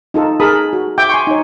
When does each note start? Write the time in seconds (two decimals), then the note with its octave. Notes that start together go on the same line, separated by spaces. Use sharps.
0.14 D#4 F4 A4
0.40 G#4 A#4 A5 B5 D#6
0.73 F#4
0.98 E5 G5 D6
1.09 G#5 C6 C#6
1.27 D#4 C#5